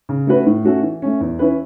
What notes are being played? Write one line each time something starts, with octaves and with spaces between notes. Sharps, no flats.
C#3
A3 C#4 F#4 B4
A2
A3 C#4 F#4 A4
E3
A3 C#4
E2
E3 C#4 E4 B4